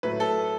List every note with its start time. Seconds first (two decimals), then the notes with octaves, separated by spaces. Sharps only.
0.03 A2 F#3 A3 B4
0.20 A4